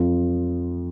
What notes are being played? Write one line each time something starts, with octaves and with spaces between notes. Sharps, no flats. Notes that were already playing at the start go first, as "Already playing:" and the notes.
Already playing: F2 F3